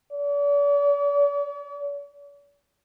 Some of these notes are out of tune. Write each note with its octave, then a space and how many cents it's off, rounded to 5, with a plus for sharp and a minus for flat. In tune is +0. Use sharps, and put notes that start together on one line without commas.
D5 -45